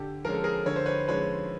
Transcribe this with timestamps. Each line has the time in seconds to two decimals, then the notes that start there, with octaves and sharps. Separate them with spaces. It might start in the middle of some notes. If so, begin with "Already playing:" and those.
Already playing: D3 G4 A4
0.25 F3 G#3 C#4 A#4
0.34 A4
0.44 G#4 A#4
0.66 D3 C#5
0.76 C5
0.86 B4 C#5
1.08 F3 G#3 C#4 B4 C#5